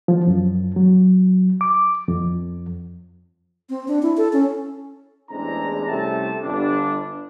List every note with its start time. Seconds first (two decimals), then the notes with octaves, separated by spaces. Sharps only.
0.08 F3
0.27 F#2
0.76 F#3
1.61 D6
2.08 F2
3.70 C4
3.88 D4
4.02 E4
4.17 A4
4.33 C#4
5.30 A1 E2 G#3 C4 D4 A#5
5.87 C2 A3 C4 C#4 G4 A5
6.42 G1 D4